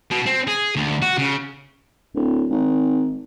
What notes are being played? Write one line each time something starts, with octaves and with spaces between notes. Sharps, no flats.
B2
C4
G#4
D2
F#4
C#3
D1
G#1